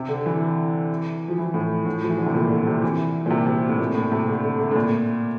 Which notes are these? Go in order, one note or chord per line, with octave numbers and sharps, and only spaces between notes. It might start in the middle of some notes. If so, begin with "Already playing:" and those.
Already playing: C3
D3
E3
F3
E3
A2
A2
F3
E3
D3
C3
A#2
D3
C3
E3
A#2
C3
C3
A2
A#2
A2
C3
D3
D3
D3
A2
A#2